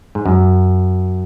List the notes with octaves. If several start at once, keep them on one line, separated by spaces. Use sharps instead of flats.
G#2
F#2